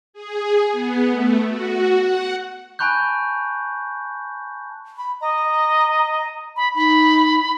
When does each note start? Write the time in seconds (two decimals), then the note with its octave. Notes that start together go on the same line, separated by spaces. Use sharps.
0.13 G#4
0.72 B3
1.08 A3
1.47 F#4
1.97 F#5
2.79 G#5 A5 B5 C#6 F#6 G6
4.98 B5
5.21 D#5 A#5
6.56 B5
6.75 D#4 B5